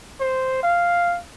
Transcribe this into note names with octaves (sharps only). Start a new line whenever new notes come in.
C5
F5